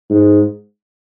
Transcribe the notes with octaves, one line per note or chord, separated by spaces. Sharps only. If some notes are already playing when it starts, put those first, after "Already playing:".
G#2